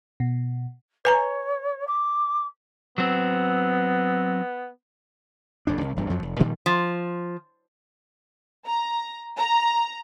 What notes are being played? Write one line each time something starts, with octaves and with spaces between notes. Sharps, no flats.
B2
B4 C#5 G#5 A#5
D6
F#3 B3 C4
F#1 F2 D4
C2
E1 G2
F2 F3 F#3
F1
A#2 D#3 F3 G3
F3
A#5
A#5